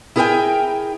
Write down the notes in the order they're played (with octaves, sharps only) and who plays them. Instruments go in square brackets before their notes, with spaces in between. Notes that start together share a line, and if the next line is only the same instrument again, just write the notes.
[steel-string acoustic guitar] E4 G#4 A#4 D#5 G5 G#5